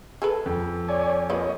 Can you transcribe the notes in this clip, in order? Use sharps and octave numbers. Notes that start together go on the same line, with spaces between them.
G#4 A4 B4
F2
C#5 D5 G#5
A#3 F4 B4 C#5 D#5